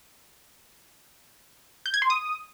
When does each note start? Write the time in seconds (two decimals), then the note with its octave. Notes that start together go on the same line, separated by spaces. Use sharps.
1.86 G6
1.94 G#6
2.02 C6
2.10 D#6